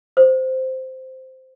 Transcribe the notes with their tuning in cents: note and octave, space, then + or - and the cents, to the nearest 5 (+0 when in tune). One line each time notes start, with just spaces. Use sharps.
C5 -5